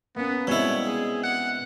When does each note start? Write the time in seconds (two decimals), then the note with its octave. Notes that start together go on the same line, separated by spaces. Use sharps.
0.16 A#3 B3 C#4
0.47 B2 G3 G#3 C4 E4 C#5
0.86 G#4
1.24 F#5